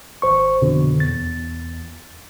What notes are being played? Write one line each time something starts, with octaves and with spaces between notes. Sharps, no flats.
G#1 C5 C#6
F2 B2 D3
E2 A6